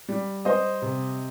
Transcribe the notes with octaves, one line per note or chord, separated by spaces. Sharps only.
G3
G3 C5 D#5
C3